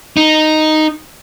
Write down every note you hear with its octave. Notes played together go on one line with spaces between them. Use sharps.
D#4